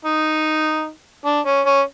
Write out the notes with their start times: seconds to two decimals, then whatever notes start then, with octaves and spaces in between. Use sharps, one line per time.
0.05 D#4
1.26 D4
1.46 C#4
1.66 C#4